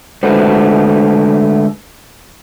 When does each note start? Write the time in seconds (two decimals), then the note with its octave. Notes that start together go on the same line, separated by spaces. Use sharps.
0.23 D3 G#3 A3 F#4 B4 C5